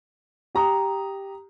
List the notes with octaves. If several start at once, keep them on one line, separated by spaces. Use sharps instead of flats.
G4 A#5 D#6